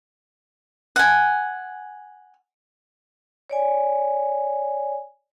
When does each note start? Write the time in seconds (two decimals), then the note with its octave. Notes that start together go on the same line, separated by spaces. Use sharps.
0.96 F#5 G#5
3.50 C#5 D5 G#5